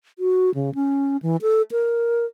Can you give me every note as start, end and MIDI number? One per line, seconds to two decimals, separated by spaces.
0.19 0.53 66
0.54 0.74 49
0.75 1.17 61
1.22 1.37 52
1.42 1.62 69
1.71 2.25 70